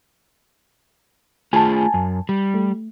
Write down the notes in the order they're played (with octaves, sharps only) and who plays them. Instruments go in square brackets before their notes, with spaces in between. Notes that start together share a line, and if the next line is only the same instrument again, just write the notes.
[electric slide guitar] A3 F4 G#4 [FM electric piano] G#5 A5
[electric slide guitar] F#2
G3
[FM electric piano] A3